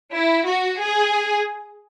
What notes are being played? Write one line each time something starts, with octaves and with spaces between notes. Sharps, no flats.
E4
F#4
G#4